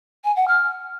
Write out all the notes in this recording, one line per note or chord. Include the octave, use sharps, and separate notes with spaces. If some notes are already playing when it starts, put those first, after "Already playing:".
G#5
F#5
F6